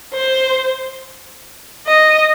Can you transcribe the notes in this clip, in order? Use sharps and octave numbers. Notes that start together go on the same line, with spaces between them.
C5
D#5